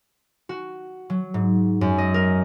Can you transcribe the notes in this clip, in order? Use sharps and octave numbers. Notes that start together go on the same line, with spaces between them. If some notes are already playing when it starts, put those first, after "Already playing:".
F#4
F#3
G#2
F#2
D#5
A#4